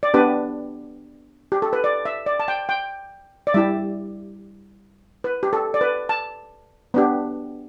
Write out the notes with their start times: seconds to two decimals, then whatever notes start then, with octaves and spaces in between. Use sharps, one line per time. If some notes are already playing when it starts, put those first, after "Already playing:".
0.03 D5
0.14 B3 D4 G4 B4
1.52 G4
1.62 A4
1.73 B4
1.84 D5
2.05 E5
2.26 D5
2.40 A5
2.48 G5
2.69 G5
3.47 D5
3.54 G3 E4 G4 E5
5.24 B4
5.43 G4
5.53 A4
5.74 D5
5.81 B4
6.09 A5
6.94 B3 D4 G4